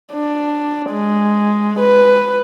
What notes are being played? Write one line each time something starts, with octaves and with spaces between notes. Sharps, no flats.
D4
G#3
B4